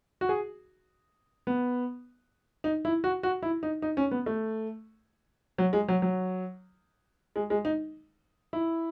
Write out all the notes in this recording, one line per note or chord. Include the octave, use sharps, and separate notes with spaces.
F#4
G#4
B3
D#4
E4
F#4
F#4
E4
D#4
D#4
C#4
B3
A3
F#3
G#3
F#3
F#3
G#3
G#3
D#4
E4